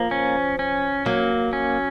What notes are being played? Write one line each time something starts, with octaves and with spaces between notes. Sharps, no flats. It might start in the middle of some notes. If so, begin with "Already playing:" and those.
Already playing: F3 A#3
C#4
C#4
F#3 A#3
C#4